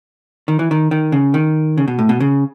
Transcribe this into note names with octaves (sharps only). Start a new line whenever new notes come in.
D#3
E3
D#3
D#3
C#3
D#3
C#3
B2
A2
B2
C#3